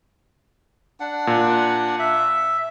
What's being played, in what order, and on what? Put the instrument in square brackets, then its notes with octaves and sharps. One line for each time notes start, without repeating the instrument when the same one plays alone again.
[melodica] D4 F#5
[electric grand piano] A#2
[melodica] E5